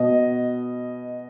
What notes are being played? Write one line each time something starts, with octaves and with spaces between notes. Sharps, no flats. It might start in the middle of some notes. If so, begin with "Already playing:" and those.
Already playing: B2 D#5